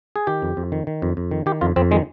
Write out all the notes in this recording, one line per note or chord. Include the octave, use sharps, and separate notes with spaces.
G#4
D#3 G4
F2
F2
D#3
D#3
F2
F2
D#3
D#3 G4
F2 F4
F2 C4
D#3 G#3